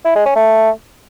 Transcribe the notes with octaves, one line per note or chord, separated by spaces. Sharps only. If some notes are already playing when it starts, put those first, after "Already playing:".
E4
G#3
C#4
A3